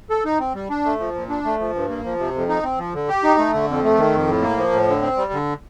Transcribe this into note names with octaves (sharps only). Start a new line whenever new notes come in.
A4
D#4
C4
G3
D4
A3
F3
A#2
D4
A3
F3
G2
A#3
F3
C3
F2
D#4
C4
F3
D3
G4
D#4
A3
D3
F2
A3
D#3
F2
A2
A#3
F3
A2
D3
C4
G3
D3